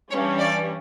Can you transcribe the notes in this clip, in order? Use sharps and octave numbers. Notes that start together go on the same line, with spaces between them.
G2 E3 G3 C#4 C#5
D5